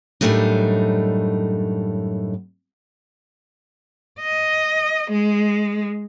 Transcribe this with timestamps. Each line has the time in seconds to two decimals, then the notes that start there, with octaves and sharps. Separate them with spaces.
0.21 F#2 A2 G3 A3 D4 D#4
4.20 D#5
5.11 G#3